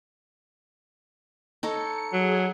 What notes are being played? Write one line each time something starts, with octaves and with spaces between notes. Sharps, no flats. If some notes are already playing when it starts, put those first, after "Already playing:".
D#4 A4 C#5 C#7
F#3 G#4